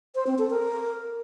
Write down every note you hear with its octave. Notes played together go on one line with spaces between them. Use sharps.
C5
C4
A4
A#4